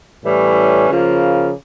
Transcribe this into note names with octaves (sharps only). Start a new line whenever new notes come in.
A2 E3 G3 C#4
C#3 F3 A#3